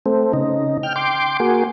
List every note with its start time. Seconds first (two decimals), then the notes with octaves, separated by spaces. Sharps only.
0.06 A3 C4
0.33 C#3 D#4
0.83 G5 F6
0.96 G5 C6 D6
1.40 A#3 F#4 G#4